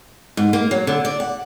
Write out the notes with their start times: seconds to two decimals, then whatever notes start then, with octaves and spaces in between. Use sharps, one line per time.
0.37 G#2
0.53 A#3
0.71 F#3
0.87 D3
1.05 D5
1.20 F#5